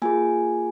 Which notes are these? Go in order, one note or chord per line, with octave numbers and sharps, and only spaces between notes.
A#3 F4 G#4 G#5